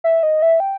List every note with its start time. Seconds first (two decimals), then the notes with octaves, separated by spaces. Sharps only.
0.04 E5
0.23 D#5
0.42 E5
0.60 G5